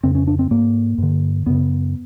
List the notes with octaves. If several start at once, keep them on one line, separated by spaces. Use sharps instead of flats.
F2 C#3 C4
C#4
D4
C4
G#2 A#3
G2 D3
F#2 C#3 B3